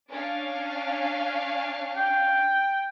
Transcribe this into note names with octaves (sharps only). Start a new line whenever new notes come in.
C#4 D4 F5
G5